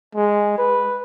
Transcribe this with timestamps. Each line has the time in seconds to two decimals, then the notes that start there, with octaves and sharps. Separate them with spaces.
0.15 G#3
0.58 B4